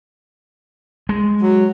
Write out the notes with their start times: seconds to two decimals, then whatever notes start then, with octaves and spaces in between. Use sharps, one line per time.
1.09 G#3
1.41 F#3